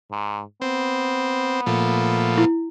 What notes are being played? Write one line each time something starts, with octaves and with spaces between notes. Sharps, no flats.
G#2
B3 C4
A#2 F3 A3
E4